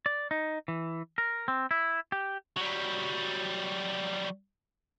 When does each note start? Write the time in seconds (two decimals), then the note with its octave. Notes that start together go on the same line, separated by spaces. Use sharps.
0.06 D5
0.31 D#4
0.68 E3
1.18 A#4
1.48 C4
1.71 E4
2.12 G4
2.57 F#3 G3